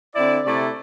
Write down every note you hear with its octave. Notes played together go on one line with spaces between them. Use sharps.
D3 C4 E4 D5
C3 A3 E4 D5